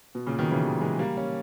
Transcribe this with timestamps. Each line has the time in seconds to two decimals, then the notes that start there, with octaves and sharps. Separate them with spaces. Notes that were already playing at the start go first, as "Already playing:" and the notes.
0.15 B2
0.27 A#2 C#3
0.39 B2 D#3
0.51 C#3 E3
0.63 D#3 G3
0.81 E3 G#3
0.99 G3 A#3
1.17 A#3 C#4